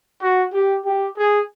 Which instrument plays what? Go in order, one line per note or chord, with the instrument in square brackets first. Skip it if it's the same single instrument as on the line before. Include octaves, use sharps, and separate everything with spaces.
[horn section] F#4
G4
G4
G#4